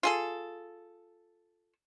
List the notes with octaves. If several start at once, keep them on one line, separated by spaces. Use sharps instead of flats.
F4 G#4 A4